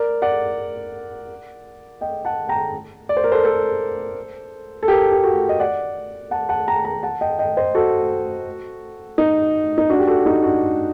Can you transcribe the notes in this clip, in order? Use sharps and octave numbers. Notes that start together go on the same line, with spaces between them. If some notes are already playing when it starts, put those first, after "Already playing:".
Already playing: A#4 D5
D5 F#5
D#5 G5
F#5 A5
G5 A#5
D5
C5
A#4
A4 C5
A4 C5
A4
G4 A#4
G4
F#4 A4
D#5
D5 F#5
F#5 A5
F#5 A5
G5 A#5
G5 A#5
F#5 A5
D#5 G5
D#5 G5
C5 D#5
F#4 A4
D#4
D#4
D4 F#4
G4
F#4 A4
D#4 G4
D4 F#4